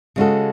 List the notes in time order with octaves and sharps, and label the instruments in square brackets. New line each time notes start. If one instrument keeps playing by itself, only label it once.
[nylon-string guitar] C#3 G#3 C#4 F#4 A4